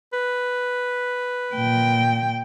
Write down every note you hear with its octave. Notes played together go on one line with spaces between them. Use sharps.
B4
A#2 G5